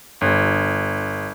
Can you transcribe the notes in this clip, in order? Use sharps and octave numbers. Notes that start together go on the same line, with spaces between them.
G1